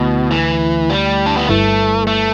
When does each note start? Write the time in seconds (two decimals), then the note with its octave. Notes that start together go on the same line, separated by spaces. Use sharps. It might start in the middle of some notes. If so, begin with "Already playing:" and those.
Already playing: D2 B2 D3 A3 E4
0.31 E3
0.90 G3
1.26 D4
1.37 B3
1.48 G1 G2 G3 A3 E4 B4
2.07 A3